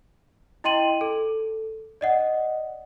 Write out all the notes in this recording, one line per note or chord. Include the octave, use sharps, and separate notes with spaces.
E4 D#5 G5 C6 D#7 F#7
A4
D5 D#5 F#5